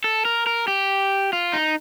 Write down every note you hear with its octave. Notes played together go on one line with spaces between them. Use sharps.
A4
A#4
A#4
G4
F4
D#4